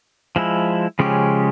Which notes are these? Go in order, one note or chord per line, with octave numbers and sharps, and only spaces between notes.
F3 G#3 E4
C#3 F3 G#3 C#4 G4